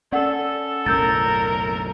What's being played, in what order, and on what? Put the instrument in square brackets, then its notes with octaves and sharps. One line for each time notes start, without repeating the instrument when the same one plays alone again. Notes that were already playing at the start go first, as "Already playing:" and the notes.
[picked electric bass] C#4 [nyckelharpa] A4 [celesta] D5 F#5
[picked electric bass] F#1 B1 A2 [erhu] A#4 [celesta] E6 G6 A6